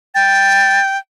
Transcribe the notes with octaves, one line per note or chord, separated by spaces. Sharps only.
G5 A6